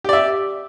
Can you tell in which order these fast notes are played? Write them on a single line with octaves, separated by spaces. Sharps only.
G4 D5 E5